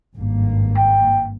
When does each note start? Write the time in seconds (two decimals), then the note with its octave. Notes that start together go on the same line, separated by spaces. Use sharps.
0.16 G#1 G2 A#3
0.77 G5